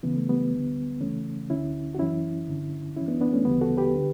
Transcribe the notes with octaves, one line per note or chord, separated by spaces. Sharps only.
C#2 C#3 E3 B3
A3
G3 B3
D2 D3
C#2 C#3 E3 A3 C#4
D2 D3 C#4 E4
F#4
F#2 E3 C#4 E4
G2 D3
F#2 E3 C#4 E4
B3 D4
B3 D4
A3 C#4
D2 C#3 E3 G3 B3
F#4 A4
G4 B4
D3